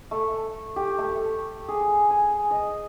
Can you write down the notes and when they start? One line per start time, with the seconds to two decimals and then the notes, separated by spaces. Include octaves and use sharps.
0.11 A3
0.76 G4
0.98 A3
1.68 G#4
2.10 G#5
2.51 D#5